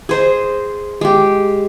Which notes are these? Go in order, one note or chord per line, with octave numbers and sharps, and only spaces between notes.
G#4 C5 D#5
G#3 G4